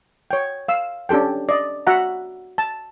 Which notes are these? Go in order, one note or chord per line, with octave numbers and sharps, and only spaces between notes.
C#5 G5
F5 E6
C#4 D4 G4 A4 G5
D5 D#5
F#4 E5 F#5 A#5
A5